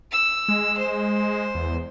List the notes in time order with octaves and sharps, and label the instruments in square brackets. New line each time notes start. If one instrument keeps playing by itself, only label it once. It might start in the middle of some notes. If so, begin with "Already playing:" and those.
[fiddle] E6
[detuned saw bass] G#3
[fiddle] C5
[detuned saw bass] E2